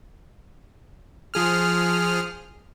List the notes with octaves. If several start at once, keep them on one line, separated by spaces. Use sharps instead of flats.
F3 G#4 F6